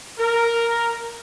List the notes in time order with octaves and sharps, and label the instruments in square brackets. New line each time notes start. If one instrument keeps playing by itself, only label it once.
[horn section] A#4